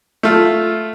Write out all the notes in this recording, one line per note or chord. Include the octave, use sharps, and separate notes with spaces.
A3 F4